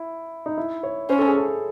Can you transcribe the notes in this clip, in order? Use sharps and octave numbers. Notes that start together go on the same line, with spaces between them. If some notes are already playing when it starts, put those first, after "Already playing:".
Already playing: E4
D#4
E4
C#5
C#4 C5
A4
G#4
A4